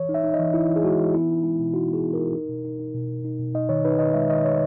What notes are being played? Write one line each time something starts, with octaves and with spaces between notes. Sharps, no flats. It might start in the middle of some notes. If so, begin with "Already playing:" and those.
Already playing: E3 C#5
D#4
E5
D#4
D#5
E3
D#4 E4
E3
G#4
G#3 F#4
E3
B3 E4
D#4
G#3 E4
B2
D#4 F#4
B3 G#4
B3
A#4
D#4
D#4
B2
D#4
D#4
B2
B2
D#4
B2
D#4 D#5
D#3 C#5
D#4 B4
D#3 D#5
G#3 E5
D#3 D#5
D#4 C#5